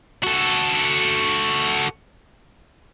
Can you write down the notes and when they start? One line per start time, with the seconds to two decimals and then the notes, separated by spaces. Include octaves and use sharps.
0.23 F#4 A4